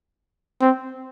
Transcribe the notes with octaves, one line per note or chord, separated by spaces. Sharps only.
C4